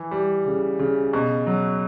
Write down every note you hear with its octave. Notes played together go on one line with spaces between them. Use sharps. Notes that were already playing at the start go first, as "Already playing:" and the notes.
Already playing: E3
G3
C#3
C#3
B2
F#3